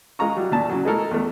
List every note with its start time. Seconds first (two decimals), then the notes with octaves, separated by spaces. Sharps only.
0.19 G#3 F4 A#5 C#6
0.37 F#3 G3
0.51 D2 A#2 A5
0.70 C#3 F#3
0.85 G#3 A3 E4 A4 A#4
1.11 E2 A3